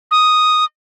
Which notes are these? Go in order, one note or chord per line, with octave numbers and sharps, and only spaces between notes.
D#6